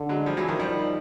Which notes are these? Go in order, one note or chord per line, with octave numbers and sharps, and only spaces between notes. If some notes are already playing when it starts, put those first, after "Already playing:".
Already playing: D3
F#3 G#3
F3 G3
E3 F#3
D#3 F3
D#3 F3 G3